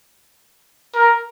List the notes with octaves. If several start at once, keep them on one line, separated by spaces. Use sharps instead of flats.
A#4